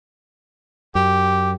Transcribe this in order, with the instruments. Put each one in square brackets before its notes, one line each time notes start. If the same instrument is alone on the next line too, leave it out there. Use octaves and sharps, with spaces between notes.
[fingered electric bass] F#2 [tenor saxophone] G4